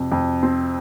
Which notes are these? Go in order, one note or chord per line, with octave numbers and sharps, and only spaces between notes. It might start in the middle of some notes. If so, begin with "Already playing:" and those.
Already playing: F2 C3
F2
C4